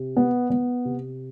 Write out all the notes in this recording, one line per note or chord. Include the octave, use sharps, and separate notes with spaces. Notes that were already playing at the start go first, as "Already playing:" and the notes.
Already playing: C3
B3
B3
C3